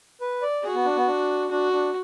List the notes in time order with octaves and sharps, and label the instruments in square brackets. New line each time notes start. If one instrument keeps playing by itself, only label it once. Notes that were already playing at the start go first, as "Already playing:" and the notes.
[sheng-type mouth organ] B4
D5
[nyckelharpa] F#4 [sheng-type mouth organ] G#4
[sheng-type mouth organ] B3
D4
B3
D4
[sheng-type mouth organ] D4 [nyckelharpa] F#4
[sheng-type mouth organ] D4